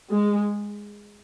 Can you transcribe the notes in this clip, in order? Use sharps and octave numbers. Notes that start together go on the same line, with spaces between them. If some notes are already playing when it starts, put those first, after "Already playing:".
G#3